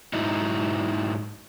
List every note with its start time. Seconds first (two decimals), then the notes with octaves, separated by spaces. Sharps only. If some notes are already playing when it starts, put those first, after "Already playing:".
0.13 G#2 F#3 D#4 E4